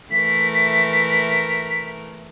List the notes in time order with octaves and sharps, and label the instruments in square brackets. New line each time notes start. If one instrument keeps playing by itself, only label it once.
[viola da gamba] E3 A3 A#4 [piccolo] B6